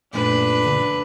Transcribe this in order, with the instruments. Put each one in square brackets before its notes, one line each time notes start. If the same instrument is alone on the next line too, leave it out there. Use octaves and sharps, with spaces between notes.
[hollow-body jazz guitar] F#2 A#2 A3 [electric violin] D4 [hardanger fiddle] B4
[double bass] D3